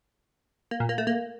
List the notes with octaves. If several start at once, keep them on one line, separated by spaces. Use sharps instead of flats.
A#3
A#2
A#3
A3
A#3